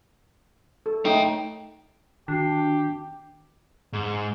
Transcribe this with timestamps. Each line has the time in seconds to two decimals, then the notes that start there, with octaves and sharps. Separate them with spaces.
0.86 A4
1.05 A3 D#4 C#5 G5
2.28 D#3 D4 F#4 G4 C7
3.93 G#2